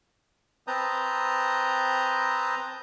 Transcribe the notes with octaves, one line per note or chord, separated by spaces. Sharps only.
C4 B4 A5 A#5 D#6 G6